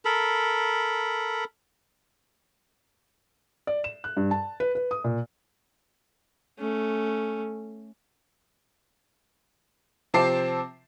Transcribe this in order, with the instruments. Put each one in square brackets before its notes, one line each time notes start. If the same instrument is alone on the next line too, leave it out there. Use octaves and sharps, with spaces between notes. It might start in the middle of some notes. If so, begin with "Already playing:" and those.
[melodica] A4 A#4 B5
[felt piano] D5
E7
F#6
G2
A5
B4
B4
D#6
A#2
[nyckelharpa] A3 C#4
[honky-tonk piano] C3 F3 C4 A5 D6 C7